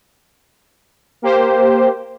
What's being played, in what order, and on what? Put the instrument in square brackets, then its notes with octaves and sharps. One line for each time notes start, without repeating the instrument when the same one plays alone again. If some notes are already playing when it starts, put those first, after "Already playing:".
[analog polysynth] A#3 G4 C5